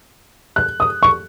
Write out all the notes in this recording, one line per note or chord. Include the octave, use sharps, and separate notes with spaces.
F#6
D#6
C#6